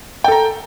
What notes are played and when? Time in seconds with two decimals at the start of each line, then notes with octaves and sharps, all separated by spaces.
0.24 G5
0.28 A4
0.32 A#5